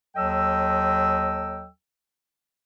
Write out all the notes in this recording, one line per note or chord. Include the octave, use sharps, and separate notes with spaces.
D#2 F#3 A4 D#5 G5 E6